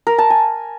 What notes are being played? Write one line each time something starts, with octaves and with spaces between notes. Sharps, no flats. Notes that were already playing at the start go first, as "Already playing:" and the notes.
A#4
A5
G#5